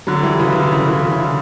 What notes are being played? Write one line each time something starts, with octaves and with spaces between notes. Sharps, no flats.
D3 F#3
E3 G3
C#3 E3
D3
C#3 E3
C#3 E3
C#3 E3
D3